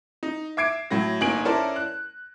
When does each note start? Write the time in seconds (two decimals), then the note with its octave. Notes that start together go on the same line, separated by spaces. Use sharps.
0.23 D#4
0.57 E5 D6 G#6 C7 D7
0.91 A2 F#3 A#6
1.21 G1 A#3 D#4 G#5 D7 F#7
1.45 C#4 E4 A4 A#4 C5 D5
1.76 F#6